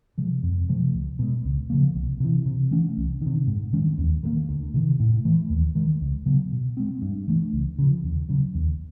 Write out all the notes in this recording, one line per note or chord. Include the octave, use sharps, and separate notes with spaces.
C3 F3 G#3
F2
C3 F3 A3
C#2
B2 G#3
C#2
C#3 F3 A#3
C2
C3 E3
C3
E3 A3 C#4
C2
C3 D#3
G#2
D#3 G#3 C#4
D#2
D#3 F#3 A#3
D2
C3 D#3
A2
E3 A3
D#2
D#3 G#3
C#2
C#3 F#3 B3
B2
G#3 C4
G2
E3 A3 D4
C#2
C#3 F3
D#2
C#3 F#3
D#2